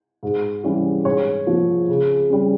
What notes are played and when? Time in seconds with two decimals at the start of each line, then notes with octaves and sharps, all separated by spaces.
0.23 G#2
0.64 E3 G3 C#4
1.05 G#2 C#5
1.47 F3 A#3
1.89 C#3
2.30 G3 C#4